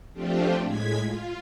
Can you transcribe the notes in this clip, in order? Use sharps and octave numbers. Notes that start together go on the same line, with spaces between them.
F3 A3 C4 D4 F4 G4
A2 G#3 G#6 B6
F4